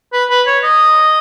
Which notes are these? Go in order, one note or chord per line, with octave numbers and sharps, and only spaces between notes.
B4
B4
C#5
D#5